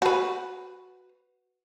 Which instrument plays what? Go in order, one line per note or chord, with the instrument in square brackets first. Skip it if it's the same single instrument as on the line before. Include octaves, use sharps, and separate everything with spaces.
[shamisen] F#4 B4